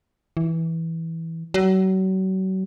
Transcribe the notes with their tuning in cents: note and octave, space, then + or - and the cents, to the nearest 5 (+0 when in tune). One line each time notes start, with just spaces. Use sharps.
E3 -10
F#3 +35